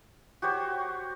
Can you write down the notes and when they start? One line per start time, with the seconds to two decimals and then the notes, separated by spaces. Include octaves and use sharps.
0.42 F#4 G4 C5 C#5